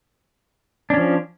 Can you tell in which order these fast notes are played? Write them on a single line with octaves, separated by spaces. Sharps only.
D4 C#4 F3